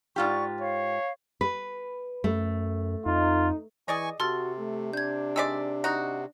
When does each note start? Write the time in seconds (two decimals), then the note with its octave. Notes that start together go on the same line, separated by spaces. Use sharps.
0.16 G#2 F4 G4 D5 C#6
0.61 C#5 F5
1.41 B4
2.24 F#2 A3
3.06 F2 D#4 F4
3.88 E3 G#4 D5 D#5 G#5 C#6
4.20 C3 F#4 A4 C6 F6 A6
4.58 A3
4.93 D4 G6 G#6
5.36 D#3 G#3 D5 E6 B6
5.84 D#4 F#4